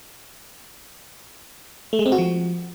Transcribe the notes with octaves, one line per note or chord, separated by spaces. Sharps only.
A3
G#3
C4
F#4
F3